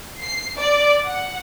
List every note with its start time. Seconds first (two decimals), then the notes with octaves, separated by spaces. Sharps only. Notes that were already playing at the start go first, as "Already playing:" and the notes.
0.21 C7
0.58 D5
1.07 F#5